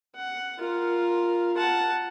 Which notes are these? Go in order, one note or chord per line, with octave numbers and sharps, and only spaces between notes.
F#5
F4 A#4
F#5 A5